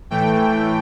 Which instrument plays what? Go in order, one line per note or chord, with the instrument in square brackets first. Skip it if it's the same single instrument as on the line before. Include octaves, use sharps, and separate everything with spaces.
[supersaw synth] A2 E3 A3 G5